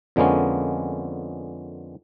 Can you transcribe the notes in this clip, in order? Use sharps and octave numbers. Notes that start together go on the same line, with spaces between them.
F2 D3 G#3 A#3 B3 C#4